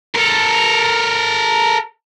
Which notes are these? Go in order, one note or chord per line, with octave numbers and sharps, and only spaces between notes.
A4 A#4